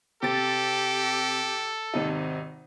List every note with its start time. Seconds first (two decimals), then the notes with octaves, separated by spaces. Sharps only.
0.23 C3 G4 A4 A6
1.94 G#1 C3 D#4